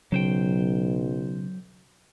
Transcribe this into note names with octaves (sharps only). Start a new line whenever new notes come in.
B1 C#3 F#3 C5 G5